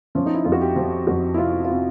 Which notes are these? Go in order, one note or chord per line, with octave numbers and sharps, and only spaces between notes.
F3 C#4
D#4
E4
F2 F4
F#4
G4
F3
F2 F#4
E4
C3 F4
F4
C3 E4